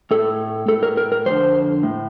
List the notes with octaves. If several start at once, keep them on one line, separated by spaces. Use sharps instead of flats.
A2 A4
A2 A4
A#4
A#4
A#4
F2 D3 C5
A2